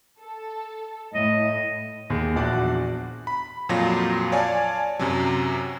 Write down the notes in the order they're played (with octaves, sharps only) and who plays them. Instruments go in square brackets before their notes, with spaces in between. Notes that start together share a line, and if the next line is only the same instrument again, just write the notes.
[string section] A4
[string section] A2 [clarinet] D#5
[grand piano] D#2 G#4
A#1 E2 D4 F#4 D5
[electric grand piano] B5
F2 A#2 F#3 F4 A#6
C#5 D5 F5 G#5 A5
F#2 C3 F#3